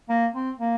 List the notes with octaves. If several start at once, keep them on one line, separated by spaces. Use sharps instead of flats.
A#3
C4
A#3